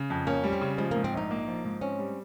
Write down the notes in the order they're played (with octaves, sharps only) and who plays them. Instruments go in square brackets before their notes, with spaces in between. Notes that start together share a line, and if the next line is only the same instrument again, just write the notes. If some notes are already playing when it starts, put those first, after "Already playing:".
Already playing: [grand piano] C#3
F2
[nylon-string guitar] A#3 [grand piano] C#4
[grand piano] G3
[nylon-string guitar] C4
[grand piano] C#3
[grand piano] F3 [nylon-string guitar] G#3
[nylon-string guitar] A#3
[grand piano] G#2
[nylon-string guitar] C4
[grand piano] A#1 [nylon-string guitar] D#4
[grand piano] A#3
F3
G#2
[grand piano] C4 [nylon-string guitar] C#4
[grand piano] G3